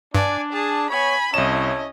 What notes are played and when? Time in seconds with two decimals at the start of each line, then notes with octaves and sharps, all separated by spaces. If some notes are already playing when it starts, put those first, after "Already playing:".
0.15 G2 D4 D5 G#5
0.53 G#4 A5
0.90 B3 C#5 G#5 B5
1.34 C2 C#4 E4 C#5 D#5 A5 E7